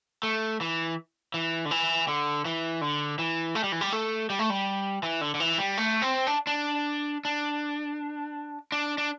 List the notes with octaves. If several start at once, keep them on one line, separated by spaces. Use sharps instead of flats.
A3
E3
E3
D3
E3
D3
E3
D3
E3
A3
G3
E3
G3
A3
G3
A3
G3
E3
D3
D3
E3
G3
A3
C4
D4
D4
D4
D4
D4